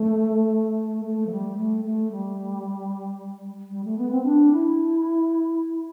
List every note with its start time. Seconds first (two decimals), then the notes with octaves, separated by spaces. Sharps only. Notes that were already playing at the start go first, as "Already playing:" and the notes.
Already playing: A3
1.05 A3
1.26 F3
1.30 G3
1.57 A3
1.84 A3
2.11 G3
3.70 G3
3.84 A3
3.97 B3
4.11 C4
4.24 D4
4.51 E4